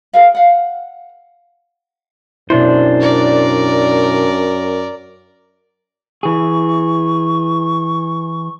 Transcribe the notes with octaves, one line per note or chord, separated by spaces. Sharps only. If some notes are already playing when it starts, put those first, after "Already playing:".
G#4 A#4 F5
F5 F#5
F#2 B2 D4 E4 C5
A#4 D5
E3 G#4 C#6